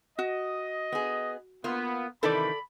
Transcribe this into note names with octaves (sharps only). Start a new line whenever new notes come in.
F#4 D#5
B3 G#4
A#3 B3 F4
C3 D#3 E3 A4 D5 B5